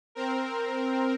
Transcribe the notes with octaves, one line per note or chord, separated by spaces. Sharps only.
C4 A#4